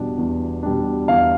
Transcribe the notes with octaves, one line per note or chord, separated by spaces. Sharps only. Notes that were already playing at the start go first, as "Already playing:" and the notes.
Already playing: E2 B2 G3 D4
E2
B2 G3 D4
E2 F5